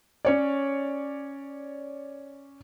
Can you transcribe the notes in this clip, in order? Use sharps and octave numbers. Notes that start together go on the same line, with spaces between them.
C#4 C#5 D5